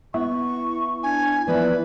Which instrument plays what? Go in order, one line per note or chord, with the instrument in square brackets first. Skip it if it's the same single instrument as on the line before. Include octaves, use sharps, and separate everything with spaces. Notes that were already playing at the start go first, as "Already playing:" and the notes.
[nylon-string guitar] B3 [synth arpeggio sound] E4 [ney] C#6
[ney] D4 [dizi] G#5
[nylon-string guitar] E3 F3 B3 [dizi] B4 [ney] D5